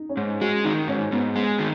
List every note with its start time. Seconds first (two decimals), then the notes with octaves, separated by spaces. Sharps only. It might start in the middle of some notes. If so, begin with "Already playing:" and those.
Already playing: D#4
0.09 C#4
0.17 G#2
0.41 G#3 F#4
0.64 D#3 D#4
0.88 G#2 C#4
1.12 G#2 B3
1.36 G#3 B3
1.59 D#3